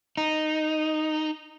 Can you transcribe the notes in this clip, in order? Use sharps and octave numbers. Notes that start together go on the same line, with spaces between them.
D#4